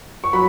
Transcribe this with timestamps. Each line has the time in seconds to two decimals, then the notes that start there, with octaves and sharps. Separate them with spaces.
0.24 C#6
0.33 F#3 B5